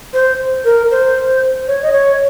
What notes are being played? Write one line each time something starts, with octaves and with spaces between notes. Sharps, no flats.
C5
A#4
C5
C#5
D#5
C#5